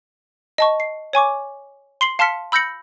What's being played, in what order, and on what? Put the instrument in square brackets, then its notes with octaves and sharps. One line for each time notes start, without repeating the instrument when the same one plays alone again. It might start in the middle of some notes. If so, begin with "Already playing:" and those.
[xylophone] D#5 A5 C#6
C7
C#5 G#5 C#6 D6
C6 C7 F#7
F5 A5 C6 F6 B6 C#7
B5 E6 G6 A#6 C#7 F#7